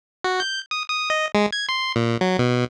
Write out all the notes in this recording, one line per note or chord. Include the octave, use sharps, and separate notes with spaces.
F#4
G6
D#6
D#6
D#5
G#3
G#6
C6
A#2
F#3
B2